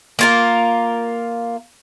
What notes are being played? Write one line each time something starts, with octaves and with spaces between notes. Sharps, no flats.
A#3 F4 A#4